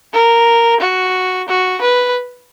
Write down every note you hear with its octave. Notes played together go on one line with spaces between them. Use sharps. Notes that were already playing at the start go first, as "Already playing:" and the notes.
A#4
F#4
F#4
B4